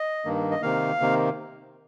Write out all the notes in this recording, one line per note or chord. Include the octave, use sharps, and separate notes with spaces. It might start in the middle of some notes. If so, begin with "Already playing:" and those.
Already playing: D#5
G2 D#3 A#3
D#5
C3 D#3 A#3 F5
C3 D#3 A#3